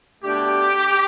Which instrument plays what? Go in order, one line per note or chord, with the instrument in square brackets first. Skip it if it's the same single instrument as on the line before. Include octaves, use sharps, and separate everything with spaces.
[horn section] B2 A3 D4 G4